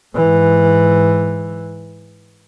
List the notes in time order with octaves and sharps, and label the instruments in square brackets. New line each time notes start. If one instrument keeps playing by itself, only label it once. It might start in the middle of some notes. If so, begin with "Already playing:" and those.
[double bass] G#2 E3